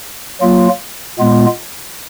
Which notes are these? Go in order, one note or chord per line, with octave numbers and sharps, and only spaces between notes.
F#3 A#3 F4
A#2 G#3 B3 F4